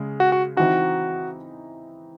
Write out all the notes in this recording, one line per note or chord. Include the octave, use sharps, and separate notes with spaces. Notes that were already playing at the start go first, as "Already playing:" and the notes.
Already playing: C#3 G#3
F#4
F#4
E3 C4 D#4 F#4